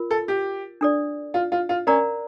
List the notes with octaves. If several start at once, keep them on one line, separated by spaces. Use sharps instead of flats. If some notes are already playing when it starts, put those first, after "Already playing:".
Already playing: F4 A#4
A4
G4
D4 A4 D5
F4
F4
F4
C#4 A#4 D5 F5 A#5